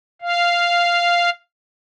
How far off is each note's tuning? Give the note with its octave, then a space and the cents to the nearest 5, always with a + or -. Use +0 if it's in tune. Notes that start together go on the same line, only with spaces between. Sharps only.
F5 -5